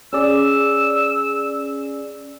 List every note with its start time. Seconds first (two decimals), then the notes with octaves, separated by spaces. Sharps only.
0.13 C#4 G#4 D5 E6